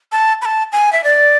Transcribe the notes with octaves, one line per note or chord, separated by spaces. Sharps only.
A5
B5
A5
G#5
E5
D5